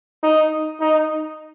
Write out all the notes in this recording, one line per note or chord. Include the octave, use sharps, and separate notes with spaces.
D#4
D#4